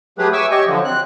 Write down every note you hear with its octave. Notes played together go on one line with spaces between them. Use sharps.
F#3 A3 G4 G#4 B4
E5 G#5 C#6 D6 E6
G4 C#5 D#5 C#6
D3 F3 F#3
C4 F#6